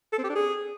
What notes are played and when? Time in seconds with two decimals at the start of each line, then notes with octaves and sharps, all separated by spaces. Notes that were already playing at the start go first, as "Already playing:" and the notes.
0.13 A4
0.18 C4
0.24 G4
0.30 D4
0.35 G#4